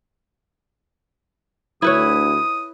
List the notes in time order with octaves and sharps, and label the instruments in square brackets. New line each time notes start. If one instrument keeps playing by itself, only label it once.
[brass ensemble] D2 [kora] E4 B4 C#5 [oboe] D#6